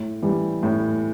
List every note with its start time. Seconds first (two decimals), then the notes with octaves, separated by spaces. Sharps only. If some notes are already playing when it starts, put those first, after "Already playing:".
Already playing: A2
0.22 E3 G3
0.63 A2